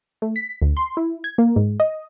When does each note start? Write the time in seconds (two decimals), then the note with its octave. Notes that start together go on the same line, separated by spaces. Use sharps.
0.22 A3
0.36 B6
0.62 D2
0.77 C6
0.97 E4
1.24 G#6
1.38 A#3
1.56 G#2
1.80 D#5